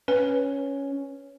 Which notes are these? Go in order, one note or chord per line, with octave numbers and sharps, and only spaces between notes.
C#4 B4